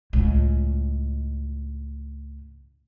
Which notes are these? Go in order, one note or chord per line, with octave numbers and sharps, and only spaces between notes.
C#2 A2